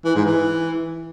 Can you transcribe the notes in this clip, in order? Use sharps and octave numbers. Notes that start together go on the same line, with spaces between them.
E3
G#2
E3